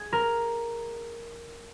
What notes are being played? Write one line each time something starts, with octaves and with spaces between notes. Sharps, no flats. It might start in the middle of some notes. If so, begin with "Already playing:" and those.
Already playing: G#4
A#4